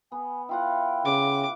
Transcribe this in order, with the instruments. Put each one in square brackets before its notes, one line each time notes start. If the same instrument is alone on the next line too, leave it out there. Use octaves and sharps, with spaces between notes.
[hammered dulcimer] B3 [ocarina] G#5
[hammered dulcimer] E4 F4 F#5 [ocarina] G5
[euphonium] C#3 [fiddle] D6